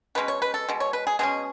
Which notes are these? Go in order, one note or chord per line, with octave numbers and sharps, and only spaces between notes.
B2 G#3 C#4 B4
C#5
B4
A4
B2 G#3
C#5
B4
G#4
B2 G#3 C#4 G#4